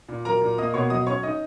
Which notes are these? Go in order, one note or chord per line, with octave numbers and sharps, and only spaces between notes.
A#2
F#3 A#4 A#5
A#2
A#3 D#5 D#6
B2 C#5 C#6
F#3 D#5 D#6
C#4 C#5 C#6
D#4 D#5 D#6